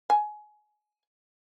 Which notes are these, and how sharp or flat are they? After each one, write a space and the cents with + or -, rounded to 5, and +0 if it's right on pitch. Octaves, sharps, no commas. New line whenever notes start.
G#5 +25